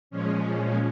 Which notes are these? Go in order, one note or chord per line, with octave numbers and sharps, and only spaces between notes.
A#2 F3 G#3 C#4